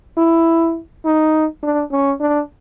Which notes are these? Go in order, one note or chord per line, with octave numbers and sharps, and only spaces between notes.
E4
D#4
D4
C#4
D4